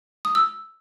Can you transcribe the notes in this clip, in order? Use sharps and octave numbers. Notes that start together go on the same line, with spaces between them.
D#6
E6